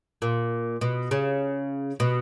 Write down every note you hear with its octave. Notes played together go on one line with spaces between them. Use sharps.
A#2
B2
C#3
B2